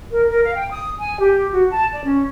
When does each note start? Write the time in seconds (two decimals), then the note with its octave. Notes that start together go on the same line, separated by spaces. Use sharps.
0.11 A#4
0.30 A#4
0.43 F5
0.57 G5
0.71 D#6
1.00 G#5
1.20 G4
1.52 F#4
1.71 A5
1.93 D5
2.05 C#4